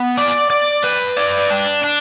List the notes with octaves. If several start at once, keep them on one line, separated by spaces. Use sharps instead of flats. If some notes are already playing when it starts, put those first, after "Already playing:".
Already playing: B3
D5
D5
B4
D5
D4
D4